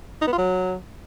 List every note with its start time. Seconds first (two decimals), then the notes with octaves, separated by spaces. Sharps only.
0.22 D#4
0.27 B3
0.33 F4
0.38 F#3